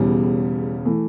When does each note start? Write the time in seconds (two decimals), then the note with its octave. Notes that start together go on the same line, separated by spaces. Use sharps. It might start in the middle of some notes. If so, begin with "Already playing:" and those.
Already playing: E1 E2 C#3 E3 G3
0.85 E3 A3